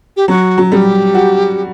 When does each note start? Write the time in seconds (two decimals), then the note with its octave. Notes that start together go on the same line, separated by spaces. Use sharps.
0.17 G4
0.28 F#3 F#4
0.58 F#3
0.72 G3 G4 A4
1.14 F#4